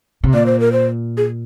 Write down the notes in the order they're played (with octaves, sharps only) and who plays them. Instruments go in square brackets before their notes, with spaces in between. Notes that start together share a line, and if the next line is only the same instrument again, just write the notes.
[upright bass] C3
[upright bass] A#2 [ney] D5
[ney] C5
A#4
C5
G#4